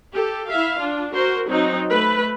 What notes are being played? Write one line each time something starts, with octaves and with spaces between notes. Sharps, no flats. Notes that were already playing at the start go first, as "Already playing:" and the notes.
G4 A4
E4 E5 F5
D4 F4
F#4 A#4 C5
F#3 C4 D#4
A3 B4